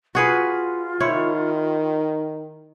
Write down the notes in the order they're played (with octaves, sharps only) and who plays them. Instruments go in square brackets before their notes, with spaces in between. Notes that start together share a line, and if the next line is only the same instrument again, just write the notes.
[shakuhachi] F4 [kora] F#4 G#4 B4
[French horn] D#3 [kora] E4 C5 C#5